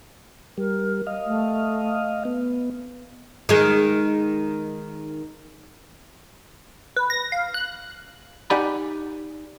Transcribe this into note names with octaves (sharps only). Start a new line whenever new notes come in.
G3 A#4
D#5 F5
A3
B3
D#3 G#3
B4
A#6
F5
F#6
D#4 G4 D5 F#5 G#5 B5